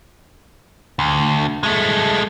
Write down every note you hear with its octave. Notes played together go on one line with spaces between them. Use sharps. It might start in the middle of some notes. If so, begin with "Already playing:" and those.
D2
G#3 A3